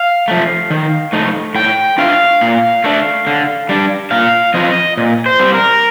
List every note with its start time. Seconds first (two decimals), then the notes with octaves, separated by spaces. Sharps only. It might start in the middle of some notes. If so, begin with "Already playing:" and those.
Already playing: F5
0.28 F3 A3
0.70 D#3
1.13 A3 D#4
1.55 A2 G5
1.98 A3 D4 F4 F5
2.41 A#2
2.84 A3 D4
3.27 D3
3.69 G3 D4
4.11 A#2 F5
4.54 F3 C4 F4 D#5
4.97 A#2
5.26 C5
5.40 G3 C4
5.54 A#4